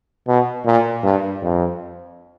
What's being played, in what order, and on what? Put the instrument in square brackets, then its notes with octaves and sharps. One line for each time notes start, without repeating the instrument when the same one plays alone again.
[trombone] B2
A#2
G2
F2